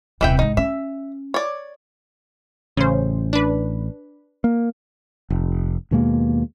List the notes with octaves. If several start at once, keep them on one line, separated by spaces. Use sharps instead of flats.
D#1 C3 E3 E5 G5
A1 G#2 D#4
C#4 E5
C#5 D5
A1 C#3 C5
D4 B4
A#3
F1
D#2 B2 G#3 A#3